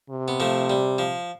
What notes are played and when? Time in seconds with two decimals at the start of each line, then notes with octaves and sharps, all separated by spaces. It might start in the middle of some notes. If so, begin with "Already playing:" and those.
0.10 C3
0.28 B3
0.40 F3 A3
0.70 G3
0.98 F3